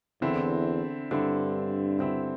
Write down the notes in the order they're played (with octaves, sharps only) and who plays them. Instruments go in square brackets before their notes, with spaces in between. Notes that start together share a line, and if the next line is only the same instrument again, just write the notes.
[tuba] E2 [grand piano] D3 C4 E4
[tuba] G2 [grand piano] D3 C4 E4
[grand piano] D3 C4 E4